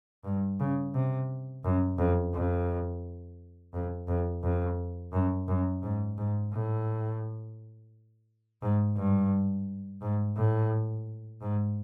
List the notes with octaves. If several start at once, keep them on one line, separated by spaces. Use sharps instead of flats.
G2
C#3
C3
F#2
F2
F2
F2
F2
F2
F#2
F#2
G#2
G#2
A2
G#2
G2
G#2
A2
G#2